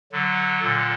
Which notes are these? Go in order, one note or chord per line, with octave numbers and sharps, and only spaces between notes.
D3 F#3
A#2 D3